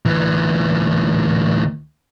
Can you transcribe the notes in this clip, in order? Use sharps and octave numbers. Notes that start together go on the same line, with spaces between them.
D2 E3